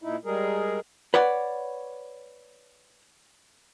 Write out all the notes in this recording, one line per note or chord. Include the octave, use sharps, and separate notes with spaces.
A#2 D#4 E4
G3 G#3 G#4 A#4
B4 C#5 D5 F#5